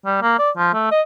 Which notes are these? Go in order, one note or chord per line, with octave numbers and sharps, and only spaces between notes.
G3
A#3
D5
F3
A3
D#5